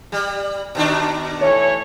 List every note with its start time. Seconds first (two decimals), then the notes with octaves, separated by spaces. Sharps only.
0.12 G3
0.75 B2 D#3 D4
1.41 E3 A3 C#5